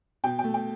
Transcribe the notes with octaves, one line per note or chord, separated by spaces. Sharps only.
B2 G5
A3 G5
G5